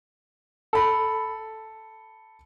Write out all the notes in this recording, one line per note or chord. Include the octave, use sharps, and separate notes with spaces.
A4 B5